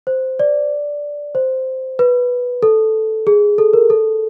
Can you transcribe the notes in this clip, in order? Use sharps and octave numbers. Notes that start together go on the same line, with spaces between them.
C5
D5
C5
B4
A4
G#4
A4
A#4
A4